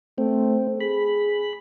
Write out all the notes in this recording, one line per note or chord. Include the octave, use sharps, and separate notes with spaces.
A3 C4
G#4 B5